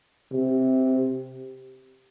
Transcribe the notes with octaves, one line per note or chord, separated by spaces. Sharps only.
C3